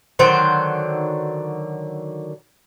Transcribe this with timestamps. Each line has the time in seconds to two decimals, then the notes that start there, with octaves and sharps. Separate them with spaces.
0.19 D3 D#3 F#3 C5